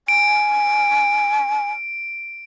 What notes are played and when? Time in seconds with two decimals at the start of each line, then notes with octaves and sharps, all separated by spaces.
0.08 G#5 D7